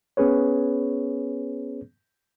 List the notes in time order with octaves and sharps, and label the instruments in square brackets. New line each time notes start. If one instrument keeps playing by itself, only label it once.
[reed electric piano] B3 C#4 G#4 B4 C#5